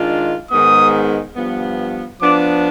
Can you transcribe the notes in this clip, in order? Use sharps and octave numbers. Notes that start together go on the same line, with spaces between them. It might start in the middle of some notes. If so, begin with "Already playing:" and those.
Already playing: D#3 G#3 D4 F4
G#2 D#3 G#3 B3 D#6
G2 F3 B3
F3 B3 D4 D6